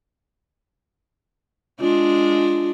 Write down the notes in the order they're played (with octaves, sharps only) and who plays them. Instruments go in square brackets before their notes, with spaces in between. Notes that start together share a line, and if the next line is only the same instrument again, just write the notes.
[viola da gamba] G#3 D4 [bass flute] F4